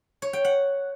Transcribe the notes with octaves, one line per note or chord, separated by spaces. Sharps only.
C#5
G5
F#5